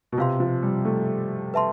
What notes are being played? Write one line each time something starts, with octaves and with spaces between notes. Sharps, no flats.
B2
C3 F4 B4 F5 C6
F3
G3
A3
B4 E5 A5 C6